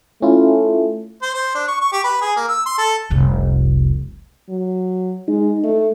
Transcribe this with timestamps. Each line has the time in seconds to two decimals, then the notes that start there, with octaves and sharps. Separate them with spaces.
0.22 A3 C#4 E4 F4
1.22 C5
1.34 C5
1.55 D4
1.68 C#6
1.81 C#6
1.92 G4
2.04 B4
2.22 G#4
2.36 A#3
2.49 E6
2.66 C6
2.78 A4
3.10 F1 C2
4.49 F#3
5.28 G#3 D#4
5.63 A3